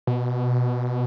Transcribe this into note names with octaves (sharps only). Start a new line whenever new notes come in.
B2